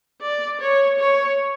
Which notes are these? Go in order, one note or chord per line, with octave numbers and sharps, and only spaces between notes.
D5
C#5
C#5